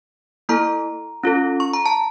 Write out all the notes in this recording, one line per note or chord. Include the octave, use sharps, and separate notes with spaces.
A#3 E4 A4 A#5
C#4 F4 A4
C#6
A#5
A5